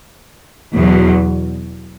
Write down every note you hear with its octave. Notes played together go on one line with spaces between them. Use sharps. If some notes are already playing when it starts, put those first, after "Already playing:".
E2 B2 F#3